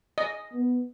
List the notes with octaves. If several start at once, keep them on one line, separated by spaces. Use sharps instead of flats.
D#5
B3